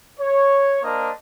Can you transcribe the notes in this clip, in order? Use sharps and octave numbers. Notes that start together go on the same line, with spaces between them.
C#5
A#3 D4 A#4 C5 D#5